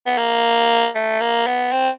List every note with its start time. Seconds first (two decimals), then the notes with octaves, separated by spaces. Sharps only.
0.06 B3
0.18 A#3
0.95 A3
1.21 A#3
1.47 B3
1.72 C4